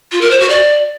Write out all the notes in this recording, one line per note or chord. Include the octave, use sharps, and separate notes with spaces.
F4
A#4
C5
F#4
D5